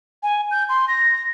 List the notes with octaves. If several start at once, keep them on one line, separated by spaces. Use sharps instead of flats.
G#5
G6
C6
A#6